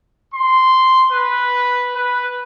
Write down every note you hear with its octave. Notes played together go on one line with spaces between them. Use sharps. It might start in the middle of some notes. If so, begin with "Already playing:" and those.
C6
B4
B4